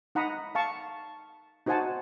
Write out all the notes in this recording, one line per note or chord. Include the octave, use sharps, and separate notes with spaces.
D#4 F#5 A#5 B5 D#6
F5 A5 C#6
D#4 F#4 C5 F#5 G#5 A5